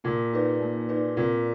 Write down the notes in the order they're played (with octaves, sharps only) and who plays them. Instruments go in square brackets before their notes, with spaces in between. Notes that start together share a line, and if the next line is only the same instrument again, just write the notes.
[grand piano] A#2 [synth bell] A#3
[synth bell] D#4 G#4 B4 D5
A#3
D#4 G#4 B4 D5
[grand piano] A#2 [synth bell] C4